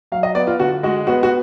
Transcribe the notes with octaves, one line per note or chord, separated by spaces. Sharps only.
F#3 F5
D#5
B3 D5
F4
D3 F#4
G#3 F#4
B3 F#4
F#4